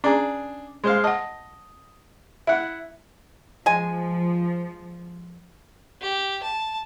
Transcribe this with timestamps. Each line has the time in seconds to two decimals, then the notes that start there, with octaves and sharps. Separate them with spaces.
0.04 C#4 D4 G#4 A#5
0.84 G#3 C5 F5
1.04 D#5 F#5 A5
2.47 E4 E5 F#5
3.66 F3 G#3 G#5
6.01 G4
6.43 A5